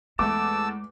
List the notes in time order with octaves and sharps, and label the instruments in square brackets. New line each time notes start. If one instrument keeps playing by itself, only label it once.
[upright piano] E2 A3 [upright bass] G#3 [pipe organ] A5 E6 [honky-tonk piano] D6